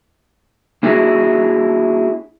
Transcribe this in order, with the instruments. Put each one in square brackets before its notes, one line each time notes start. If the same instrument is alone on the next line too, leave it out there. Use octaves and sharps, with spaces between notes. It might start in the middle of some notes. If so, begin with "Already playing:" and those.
[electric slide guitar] A#3 D4 E4 F#4 G#4